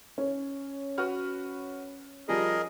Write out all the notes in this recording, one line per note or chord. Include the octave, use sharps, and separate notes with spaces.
C#4
F#4 B4 F6
F3 G3 G#4 A#4 D#5